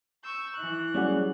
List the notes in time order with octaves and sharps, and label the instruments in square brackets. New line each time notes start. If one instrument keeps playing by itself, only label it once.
[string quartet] C#6 E6 G6
E3 F#6
[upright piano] F#3 G3 G#4 [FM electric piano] C#4 D5 F#5